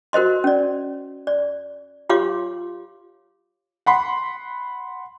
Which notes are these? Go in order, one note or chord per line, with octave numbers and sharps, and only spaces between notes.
F#4 A#4 C5 D#5 C6
C#4 D5
D5
F4 G4 C#5 F5 C6 D6
F#5 B5 C6